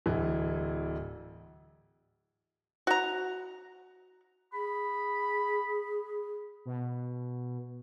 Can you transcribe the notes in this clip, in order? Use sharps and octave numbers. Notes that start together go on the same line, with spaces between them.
D1 E3
F#4 A#5
G#4 B5
B2